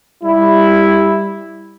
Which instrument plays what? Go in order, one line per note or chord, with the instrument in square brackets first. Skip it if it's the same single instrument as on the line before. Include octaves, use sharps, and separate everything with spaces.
[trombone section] G3 E4